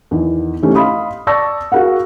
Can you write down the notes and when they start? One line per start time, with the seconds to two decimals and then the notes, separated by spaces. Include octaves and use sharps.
0.11 E2 D#3
0.62 C3 D#3 E3 A3 C#4
0.75 D#5 F5 B5 C6 D#6
1.27 D5 A5 C#6 E6 A#6
1.72 F#4 G#4 A#4 F5 F#5